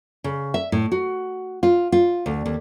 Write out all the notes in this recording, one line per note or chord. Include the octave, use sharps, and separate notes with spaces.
C#3
E5
A2
F#4
F4
F4
D2
D#2